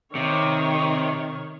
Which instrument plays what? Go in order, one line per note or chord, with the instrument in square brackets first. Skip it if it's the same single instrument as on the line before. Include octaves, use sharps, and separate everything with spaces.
[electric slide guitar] C3 [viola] D#3 C#5